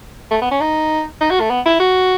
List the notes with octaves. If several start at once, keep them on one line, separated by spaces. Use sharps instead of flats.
A3
B3
C#4
D#4
D#4
F#4
A3
B3
E4
F#4